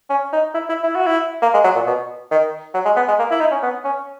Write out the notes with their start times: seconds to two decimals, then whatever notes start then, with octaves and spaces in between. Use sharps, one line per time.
0.10 C#4
0.33 D#4
0.54 E4
0.69 E4
0.84 E4
0.95 F#4
1.07 E4
1.42 A#3
1.54 G#3
1.64 F#3
1.75 A#2
1.87 B2
2.31 D#3
2.74 F#3
2.85 G#3
2.96 B3
3.08 G#3
3.19 A#3
3.31 E4
3.40 D#4
3.52 C#4
3.62 B3
3.84 C#4